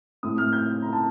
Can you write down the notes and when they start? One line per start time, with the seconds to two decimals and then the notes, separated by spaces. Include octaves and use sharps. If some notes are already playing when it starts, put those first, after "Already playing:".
0.23 A2 A3 C4 D#6
0.38 F6
0.53 G6
0.82 A#5
0.93 A5